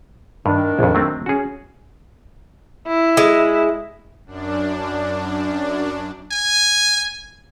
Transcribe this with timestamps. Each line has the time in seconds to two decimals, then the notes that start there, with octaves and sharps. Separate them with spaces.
0.46 G2 D#3 D4
0.79 A#1 F2
0.95 F#3 A3 C4
1.26 C#4 F#4 G#4
2.87 E4
3.17 G#3
4.25 F#2 D4
6.32 G#5